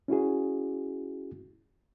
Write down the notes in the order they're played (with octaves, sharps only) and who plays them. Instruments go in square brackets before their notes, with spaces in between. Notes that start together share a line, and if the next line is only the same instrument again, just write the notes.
[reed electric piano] C#4 E4 F#4 G#4